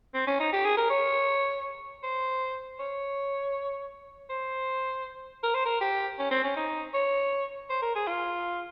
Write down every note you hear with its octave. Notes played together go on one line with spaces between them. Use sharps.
C4
C#4
D#4
G4
G#4
A#4
C#5
C5
C#5
C5
A#4
C5
A#4
G4
C#4
C4
C#4
D#4
C#5
C5
A#4
G#4
F4